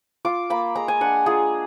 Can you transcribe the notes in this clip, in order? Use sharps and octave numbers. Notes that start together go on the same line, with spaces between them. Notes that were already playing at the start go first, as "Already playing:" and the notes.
F4 D6
A#3 B5
G#3 A#5
G#5
D4 F#5
F4 G#4